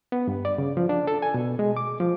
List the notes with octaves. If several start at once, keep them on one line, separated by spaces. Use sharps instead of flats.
B3
G2
D5
C#3
F3
D4
A4
G#5
B2
G#3
D6
F3